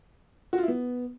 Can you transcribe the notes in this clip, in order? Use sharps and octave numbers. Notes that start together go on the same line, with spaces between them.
F#4
F4
E4
B3